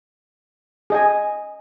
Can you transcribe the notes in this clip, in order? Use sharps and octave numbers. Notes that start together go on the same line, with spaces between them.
G#4 D#5 G#5